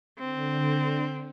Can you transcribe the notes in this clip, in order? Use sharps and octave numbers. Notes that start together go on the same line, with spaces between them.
D3 C4